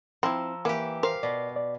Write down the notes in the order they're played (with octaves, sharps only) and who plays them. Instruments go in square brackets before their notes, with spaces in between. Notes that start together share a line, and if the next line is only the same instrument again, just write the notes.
[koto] F3 [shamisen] C4 E4 [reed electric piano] A#5 E6
[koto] E3 G4 [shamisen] A#3
[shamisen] A#4 C5 [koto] F5
[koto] B2 [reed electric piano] D5
[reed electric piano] D5